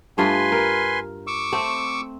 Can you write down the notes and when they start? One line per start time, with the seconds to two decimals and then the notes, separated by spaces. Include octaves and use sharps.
0.18 G2 A3 F4 B4 G#5 C6
0.52 A#4
1.27 C#6 D6 E6
1.52 A3 C4